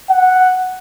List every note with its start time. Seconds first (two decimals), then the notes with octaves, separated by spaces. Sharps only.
0.10 F#5